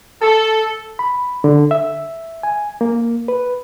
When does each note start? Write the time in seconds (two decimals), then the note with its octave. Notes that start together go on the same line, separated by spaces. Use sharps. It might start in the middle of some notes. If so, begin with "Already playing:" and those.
0.22 A4
0.99 B5
1.44 D3
1.71 E5
2.43 G#5
2.81 A#3
3.28 B4